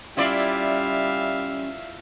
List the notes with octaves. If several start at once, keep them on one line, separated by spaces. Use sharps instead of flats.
G3 C#4 E4 F4 D5 E5 F5